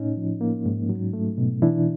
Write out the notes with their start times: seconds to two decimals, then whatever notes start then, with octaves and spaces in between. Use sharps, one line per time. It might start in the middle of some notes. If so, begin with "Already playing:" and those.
Already playing: A2 C#4 D#4
0.17 F3
0.41 A#3
0.66 G#2
0.89 F#3
1.13 A3
1.38 B2
1.62 E3 D4 E4